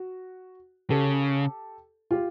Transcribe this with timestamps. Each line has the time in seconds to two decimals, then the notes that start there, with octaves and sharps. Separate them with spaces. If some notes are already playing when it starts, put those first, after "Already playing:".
Already playing: F#4
0.90 C#3 G4 A4
2.11 F4 G4